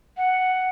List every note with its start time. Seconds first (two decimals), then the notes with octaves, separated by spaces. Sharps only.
0.17 F#5